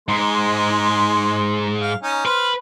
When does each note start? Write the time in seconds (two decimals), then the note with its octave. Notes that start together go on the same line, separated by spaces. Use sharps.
0.08 G#2 G#3 C6
1.80 F5
2.03 C#4 D#4
2.25 B4 C5 F6